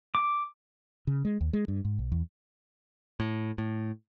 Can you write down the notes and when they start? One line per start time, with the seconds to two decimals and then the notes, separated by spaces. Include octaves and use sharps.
0.15 D6
1.07 C#3
1.25 G#3
1.41 D#2
1.53 G#3
1.68 G2
1.85 G#2
1.99 B1
2.12 E2
3.20 A2
3.58 A2